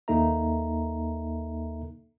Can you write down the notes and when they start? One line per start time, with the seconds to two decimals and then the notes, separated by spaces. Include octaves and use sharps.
0.08 D#2 A#3 D#4 A4 E5 A#5